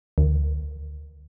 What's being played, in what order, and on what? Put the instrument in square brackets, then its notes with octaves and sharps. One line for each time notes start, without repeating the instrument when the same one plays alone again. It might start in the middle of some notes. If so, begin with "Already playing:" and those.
[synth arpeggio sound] D2